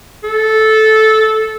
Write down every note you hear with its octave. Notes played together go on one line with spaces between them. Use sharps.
A4